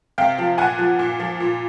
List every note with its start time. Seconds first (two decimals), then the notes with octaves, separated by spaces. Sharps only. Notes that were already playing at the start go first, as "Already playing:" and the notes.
0.18 C3 F5 G5
0.38 F3
0.58 A#2 F#5 G#5
0.78 F3
0.99 A#2
1.20 F3
1.40 A#2